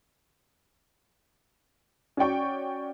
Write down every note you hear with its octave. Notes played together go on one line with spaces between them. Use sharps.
C#4 F#4 D5 G5 C#6